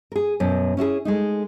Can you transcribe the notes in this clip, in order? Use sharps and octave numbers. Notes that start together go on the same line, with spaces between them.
G#4 A#4
F#2 B2
C#4 E4 F#4 G#4
G#3 A3 D#4